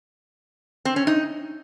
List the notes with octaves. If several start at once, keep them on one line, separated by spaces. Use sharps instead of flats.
C4
C#4
D#4